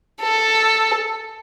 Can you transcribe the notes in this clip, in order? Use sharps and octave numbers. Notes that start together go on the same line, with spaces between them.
A4